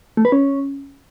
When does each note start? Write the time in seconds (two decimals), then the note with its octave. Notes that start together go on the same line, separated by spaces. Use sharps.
0.17 A3
0.25 B4
0.32 C#4